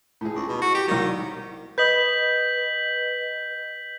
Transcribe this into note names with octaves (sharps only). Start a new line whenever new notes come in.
A2 G#4
C#2
B2
F#4
G4
C2 D#3 F#3
B4 D#5 G6 B6 F#7